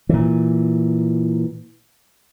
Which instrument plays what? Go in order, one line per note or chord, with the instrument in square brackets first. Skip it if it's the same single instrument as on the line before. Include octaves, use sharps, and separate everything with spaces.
[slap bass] A#2 E3